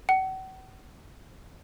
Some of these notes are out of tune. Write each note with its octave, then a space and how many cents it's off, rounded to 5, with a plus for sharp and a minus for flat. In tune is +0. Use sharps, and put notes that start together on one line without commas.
F#5 +40